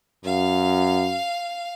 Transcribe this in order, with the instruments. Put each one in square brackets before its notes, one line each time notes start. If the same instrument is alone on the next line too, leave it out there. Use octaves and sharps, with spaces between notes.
[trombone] F#2 [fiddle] F5